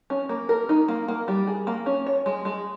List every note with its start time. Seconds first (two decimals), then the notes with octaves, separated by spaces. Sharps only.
0.10 C#4
0.29 A#3
0.49 A#4
0.69 D#4
0.88 A#3
1.08 A#3
1.28 G3
1.47 G#4
1.67 A#3
1.86 C#4
2.06 C#5
2.26 G#3
2.45 G#3